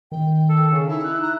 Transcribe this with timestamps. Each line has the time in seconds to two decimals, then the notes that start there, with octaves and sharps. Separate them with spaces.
0.12 D#3 G5
0.49 A4
0.71 C#3
0.89 D#4 E4
1.04 F#6
1.21 A#5